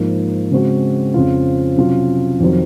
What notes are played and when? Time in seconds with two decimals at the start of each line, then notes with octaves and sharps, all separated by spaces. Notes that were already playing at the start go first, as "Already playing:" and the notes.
Already playing: G#2 F3 A#3
0.51 C#3 G#3 C4 F#4
1.14 F2 C#3 F3 C4 F4
1.77 C3 F#3 C#4 F4
2.40 F2 D#3 F#3 C4